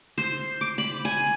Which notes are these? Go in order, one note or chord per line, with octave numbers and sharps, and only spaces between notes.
C5
D6
B5
G#5